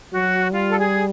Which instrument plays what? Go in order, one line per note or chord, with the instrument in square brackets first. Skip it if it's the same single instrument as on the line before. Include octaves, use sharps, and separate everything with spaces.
[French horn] F#3 [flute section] F#4
[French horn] G3 [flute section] F4
[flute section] A4
G#4